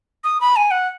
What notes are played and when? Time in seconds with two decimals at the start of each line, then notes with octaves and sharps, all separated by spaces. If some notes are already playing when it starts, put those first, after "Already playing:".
0.24 D#6
0.41 B5
0.56 G#5
0.71 F#5